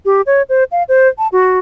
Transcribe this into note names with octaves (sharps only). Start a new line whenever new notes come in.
G4
C#5
C5
F5
C5
A5
F#4